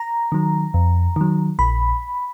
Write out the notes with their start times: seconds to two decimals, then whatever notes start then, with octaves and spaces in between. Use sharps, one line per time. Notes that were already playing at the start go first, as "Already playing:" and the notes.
Already playing: A#5
0.32 D#3 F#3
0.74 F2
1.16 D#3 F#3
1.59 A#1 B5